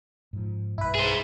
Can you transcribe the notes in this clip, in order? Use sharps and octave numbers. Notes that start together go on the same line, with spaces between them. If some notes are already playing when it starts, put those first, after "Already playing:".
G#2 F3
B1 G2 E4 B4
G#4 C5